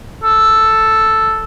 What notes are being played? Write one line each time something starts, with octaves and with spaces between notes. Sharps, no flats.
A4